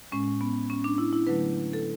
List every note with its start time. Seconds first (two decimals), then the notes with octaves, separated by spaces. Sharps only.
0.12 A2 G#3 C#4
0.41 B3
0.70 C#4
0.84 D4
0.98 E4
1.13 E4
1.27 D3 F#3 A3 B4
1.73 A4